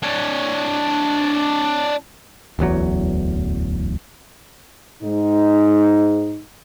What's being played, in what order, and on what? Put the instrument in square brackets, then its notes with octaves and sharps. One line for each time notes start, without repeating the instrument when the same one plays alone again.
[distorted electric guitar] D4 C#5
[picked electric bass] D1 A1 E2 F#3
[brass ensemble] G#2 D#4